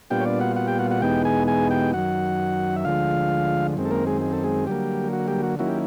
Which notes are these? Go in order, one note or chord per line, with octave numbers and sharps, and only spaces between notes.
A#2 G3 B3 D4 F4 G4 G5
C#5
D4 D5
F#4 F#5
F#4 F#5
G4 G5
F#4 F#5
F#4 F#5
E2 B2 G#3 B3 D#4 G4 G5
G#4 G#5
G#4 G#5
G4 G5
F#2 D#3 F#3 F#4 F#5
E5
D2 D3 F3 G#3 F4 F5
F#2 D#3 G#3 C4
A4
A#3 A#4
G#3 G#4
G#4
A4
G#3 G#4
D3 F#3 G3 A#3 G4
F#4
G3 G4
F#4
D#3 F#3 A#3 C#4 E4 F#4
G4